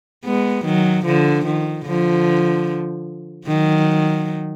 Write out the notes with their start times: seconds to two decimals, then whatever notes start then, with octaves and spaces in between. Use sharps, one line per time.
0.25 G#3 B3
0.65 D#3 F#3
1.06 D3 F3
1.46 D#3
1.86 D3 F3
3.48 D#3 F#3